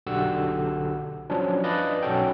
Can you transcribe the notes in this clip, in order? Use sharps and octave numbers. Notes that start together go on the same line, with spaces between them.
B1 D3 F#4 G4 F#5 E6
F3 F#3 C#4 D4
D4 B4 D5 D#5 F5
B1 C#4 F#4 A4 G5